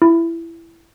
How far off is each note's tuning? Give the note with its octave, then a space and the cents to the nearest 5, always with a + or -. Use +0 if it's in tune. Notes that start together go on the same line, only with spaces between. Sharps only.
E4 +15